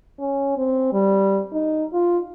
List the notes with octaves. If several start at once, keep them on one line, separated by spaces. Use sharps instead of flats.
C#4
C4
G3
D#4
F4